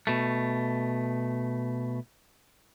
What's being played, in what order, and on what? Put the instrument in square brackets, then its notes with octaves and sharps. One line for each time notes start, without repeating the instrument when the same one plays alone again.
[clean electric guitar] B2 A3